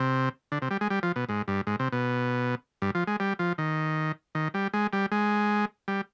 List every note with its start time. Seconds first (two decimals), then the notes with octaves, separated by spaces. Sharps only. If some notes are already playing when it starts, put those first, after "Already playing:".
Already playing: C3
0.52 D3
0.62 C3
0.71 G3
0.81 G#3
0.90 G3
1.03 F3
1.16 B2
1.29 G#2
1.48 G2
1.67 G#2
1.80 C3
1.92 B2
2.82 G2
2.95 F3
3.07 G#3
3.20 G3
3.39 F3
3.58 D#3
4.35 D#3
4.54 G3
4.74 G#3
4.93 G3
5.12 G#3
5.88 G3